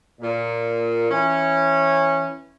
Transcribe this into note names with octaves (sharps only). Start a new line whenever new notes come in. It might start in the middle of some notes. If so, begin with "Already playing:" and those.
A#2
E3 C#4